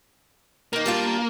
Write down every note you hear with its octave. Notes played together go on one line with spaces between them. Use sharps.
D#3 A#3 D#4
G3 D4 F4